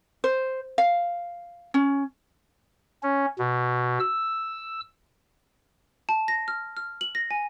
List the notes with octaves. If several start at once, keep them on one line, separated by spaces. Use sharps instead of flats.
C5
F5
C#4
C#4
B2
E6
A5
A#6
F6
F6
F#7
A#6
G#5